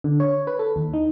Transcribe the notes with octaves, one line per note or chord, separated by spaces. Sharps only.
D3
C#5
B4
A4
D#2
D#4